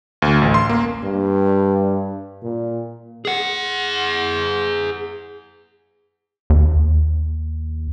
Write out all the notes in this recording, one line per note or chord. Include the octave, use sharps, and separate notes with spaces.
D2
A1
C6
A#3
G2
A#2
G#4 F#5
D#2